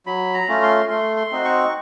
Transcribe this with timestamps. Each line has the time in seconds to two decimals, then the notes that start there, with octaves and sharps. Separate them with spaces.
0.06 F#3 B5
0.34 A#5
0.48 A3 C#4 F4
0.62 C6
0.89 A3 C6
1.17 C6
1.31 C4 D#4 F#4
1.45 C#6